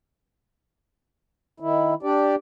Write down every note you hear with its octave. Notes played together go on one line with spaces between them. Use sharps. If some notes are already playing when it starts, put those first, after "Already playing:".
D#3 E4
D4 G4 D5